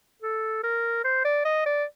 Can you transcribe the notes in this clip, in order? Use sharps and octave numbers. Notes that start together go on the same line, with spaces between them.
A4
A#4
C5
D5
D#5
D5